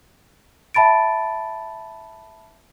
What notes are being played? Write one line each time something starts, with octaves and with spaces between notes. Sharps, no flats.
E5 A5 B5 A6 D7